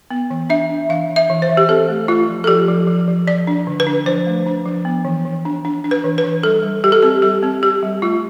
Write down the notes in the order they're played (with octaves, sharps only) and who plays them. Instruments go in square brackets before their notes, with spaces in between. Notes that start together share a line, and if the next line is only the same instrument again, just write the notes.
[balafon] B3
E3
D4 E5
D4
E3 F5
E3
E5
E3
C5
E3
G4
C4 A4
A3
A3 F4
F3
A4
F3 G4
F3
F3
F3
F3 D5
D4
D3
B4
D4
F3 C5
A3
D4
F3
B3
E3
E3
D4
D4
D4
B4
E3
B4
E3
G3 A4
G3
G3 G4
A4
C4 G4
G3 G4
C4
C4 G4
G3
A3 F4